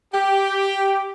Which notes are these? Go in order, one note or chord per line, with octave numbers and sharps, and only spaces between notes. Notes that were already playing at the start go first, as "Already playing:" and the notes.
G4